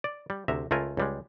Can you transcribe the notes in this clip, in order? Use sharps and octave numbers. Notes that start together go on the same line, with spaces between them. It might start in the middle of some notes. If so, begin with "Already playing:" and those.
D5
G3
D2 C3 E5 A#5
C#2 A3 F4 A#4 G#5
C#2 G3 G#3